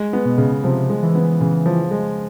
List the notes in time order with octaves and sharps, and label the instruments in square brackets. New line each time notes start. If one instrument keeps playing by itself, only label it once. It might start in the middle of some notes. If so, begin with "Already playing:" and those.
Already playing: [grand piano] G#3
B3
[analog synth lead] B2
[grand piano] C#3
[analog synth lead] C3 [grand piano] F3
[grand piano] G#3
[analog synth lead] E3
[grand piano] B3
C#3
F3
G#3